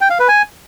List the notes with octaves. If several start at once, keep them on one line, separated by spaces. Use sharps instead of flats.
G5
F5
B4
G#5